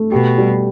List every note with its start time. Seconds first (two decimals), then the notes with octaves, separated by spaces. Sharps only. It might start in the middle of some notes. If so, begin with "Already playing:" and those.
Already playing: A3
0.12 B2 G4
0.38 G3